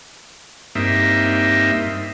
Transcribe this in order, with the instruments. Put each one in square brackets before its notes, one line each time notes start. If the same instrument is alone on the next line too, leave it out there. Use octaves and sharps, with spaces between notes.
[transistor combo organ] G2 A#3 C4 D#4 E5